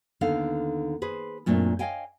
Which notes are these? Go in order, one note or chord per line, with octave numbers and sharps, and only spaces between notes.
D#2 D3 B3 D#4 A4 F5
G#4 B4 C5
F#2 A#2 A3 C4 D4
C#5 D#5 F5 G5 G#5